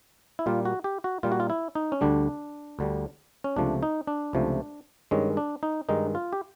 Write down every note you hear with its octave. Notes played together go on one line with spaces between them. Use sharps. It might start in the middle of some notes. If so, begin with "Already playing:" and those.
E4
A#2 G3 A#3 F4
F#4
G4
F#4
A#2 G3 A#3 F4
F#4
F4
E4
D#4
C#4
D2 D3 G3 D4
D2 D3 G3
C#4
C#2 C3 F3 A3 D4
D#4
D4
C#2 C3 F3 A3
G2 D#3 G#3 C#4
D4
D#4
G2 D#3 G#3 D#4
F4
G4